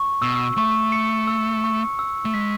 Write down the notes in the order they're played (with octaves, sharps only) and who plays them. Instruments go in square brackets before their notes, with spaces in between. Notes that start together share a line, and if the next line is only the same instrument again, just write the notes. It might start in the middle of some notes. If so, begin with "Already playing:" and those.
Already playing: [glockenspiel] C#6
[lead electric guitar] B2 [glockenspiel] E6
[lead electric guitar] A3 [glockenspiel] C#6
[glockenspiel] C#7
E6
C#6
E6
[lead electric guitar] A3
[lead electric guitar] G#3 [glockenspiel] B6